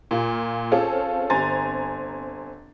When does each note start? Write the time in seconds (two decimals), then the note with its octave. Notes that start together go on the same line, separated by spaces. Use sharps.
0.11 A#2 F4
0.72 C4 C#4 F4 G#4 A4
1.30 G1 C4 G#5 A#5 C6 A6